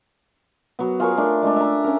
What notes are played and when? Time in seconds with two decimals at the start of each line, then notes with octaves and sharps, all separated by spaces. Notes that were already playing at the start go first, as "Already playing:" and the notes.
0.79 F#3 B3
1.00 F4 G#4 A#4 C#5
1.17 A3 D4
1.43 G#3 A3 D4
1.56 E5 A#5
1.84 C#4 A#4